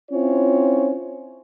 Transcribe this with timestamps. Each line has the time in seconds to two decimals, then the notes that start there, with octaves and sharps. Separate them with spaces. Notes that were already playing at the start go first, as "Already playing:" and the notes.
0.12 C4 C#4 E4 F4 C#5